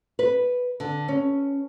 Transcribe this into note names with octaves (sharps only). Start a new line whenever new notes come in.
B4
D3
C#4